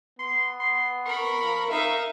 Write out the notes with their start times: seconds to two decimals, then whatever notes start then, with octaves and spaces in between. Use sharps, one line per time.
0.19 B3 C6
0.60 C6
1.05 A#4 B5 C#6
1.39 F3
1.70 D#4 A#4 E5 F5